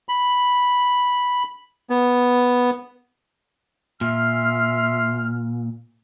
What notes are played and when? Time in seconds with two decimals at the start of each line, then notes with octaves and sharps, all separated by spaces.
0.09 B5
1.90 B3
4.01 A#2 E5 C6 F6